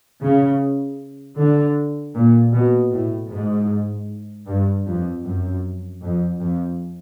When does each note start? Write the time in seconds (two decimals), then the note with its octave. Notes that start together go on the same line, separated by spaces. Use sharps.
0.21 C#3
1.38 D3
2.15 A#2
2.53 B2
2.92 A2
3.31 G#2
4.47 G2
4.86 F2
5.24 F#2
6.02 F2
6.40 F2